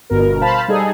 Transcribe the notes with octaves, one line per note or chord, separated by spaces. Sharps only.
G1 G2 B2 A#4
C5 F5 A5 B5
G3 D#4 G#4 A4